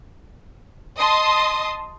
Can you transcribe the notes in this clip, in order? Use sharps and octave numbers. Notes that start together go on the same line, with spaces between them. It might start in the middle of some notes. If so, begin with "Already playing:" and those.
D#5 A5 C6 D#6